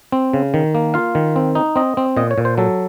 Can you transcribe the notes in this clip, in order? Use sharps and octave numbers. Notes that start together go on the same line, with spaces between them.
C4
C#3
D#3
A#3
F4 F5
D#3
C4
D#4
C4 D#5
C4
A#2 D#5
C#5
A#2
C5
F#3 A4